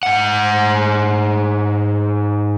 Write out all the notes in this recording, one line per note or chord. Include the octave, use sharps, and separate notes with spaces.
G#2 F#5